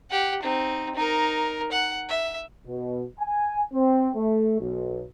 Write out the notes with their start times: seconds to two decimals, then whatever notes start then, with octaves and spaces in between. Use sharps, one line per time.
0.10 G4 F#5
0.42 C4 D#4
0.95 D#4 A#4
1.72 F#5
2.09 E5
2.67 B2
3.20 G#5
3.73 C4
4.16 A3
4.60 B1